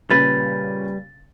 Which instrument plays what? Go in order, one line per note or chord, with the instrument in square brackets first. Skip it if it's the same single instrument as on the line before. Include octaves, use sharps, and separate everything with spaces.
[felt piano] A#2 C#3 C#4 [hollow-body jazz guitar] G3 B4 [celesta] A6